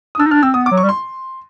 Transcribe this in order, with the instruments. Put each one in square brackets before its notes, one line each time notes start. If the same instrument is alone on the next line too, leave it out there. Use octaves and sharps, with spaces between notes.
[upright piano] D#6
[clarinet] D4 [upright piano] E6
[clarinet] D#4
[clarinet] D4 [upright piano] F6
[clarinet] C4 [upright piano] E6
[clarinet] B3 [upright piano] D#6
[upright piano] D6
[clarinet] F#3
[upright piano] C#6
[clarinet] G3
[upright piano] C6